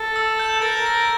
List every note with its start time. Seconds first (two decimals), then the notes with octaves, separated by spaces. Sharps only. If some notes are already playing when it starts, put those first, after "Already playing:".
Already playing: A4
0.16 E6
0.39 G6
0.62 A#4 A6
0.86 A#6